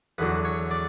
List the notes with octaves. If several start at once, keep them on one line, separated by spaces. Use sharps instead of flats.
E2 D3 F#3 B4
C#5
D5